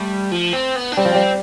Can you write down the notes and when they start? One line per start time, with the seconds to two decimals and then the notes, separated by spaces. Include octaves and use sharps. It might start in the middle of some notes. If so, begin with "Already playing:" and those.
Already playing: G3 A3
0.32 F3
0.53 C4
0.76 B3
0.92 D4
0.97 G3 C4
1.05 F3
1.15 G3